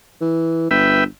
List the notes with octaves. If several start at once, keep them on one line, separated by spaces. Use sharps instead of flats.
E3
G1 B4 E5 G5